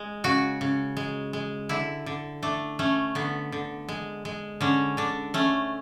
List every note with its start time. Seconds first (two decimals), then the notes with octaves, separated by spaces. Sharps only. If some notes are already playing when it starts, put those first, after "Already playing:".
Already playing: G#3
0.24 C#3 F#4
0.61 C#3
0.97 G#3
1.33 G#3
1.69 D3 E4
2.06 D3
2.42 A3 D4
2.79 A3 C#4
3.15 D3 B3
3.52 D3
3.89 G#3
4.25 G#3
4.61 D3 C#4
4.97 D3 D4
5.34 A3 C#4